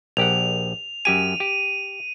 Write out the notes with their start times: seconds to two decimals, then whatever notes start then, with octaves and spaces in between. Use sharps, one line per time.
0.17 A#1 G4 F#5 F7
1.05 F#2 G4 G#5 D#7
1.40 G4